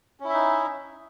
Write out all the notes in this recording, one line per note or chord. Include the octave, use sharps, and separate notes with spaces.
C#4 D#4 E4 E5